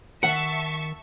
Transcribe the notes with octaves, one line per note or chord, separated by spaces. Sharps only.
D#3 E5 F#5 A5 C#6